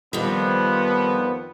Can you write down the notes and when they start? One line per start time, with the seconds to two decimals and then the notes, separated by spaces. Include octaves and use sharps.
0.13 F2 D#3 F3 G3 B3 C4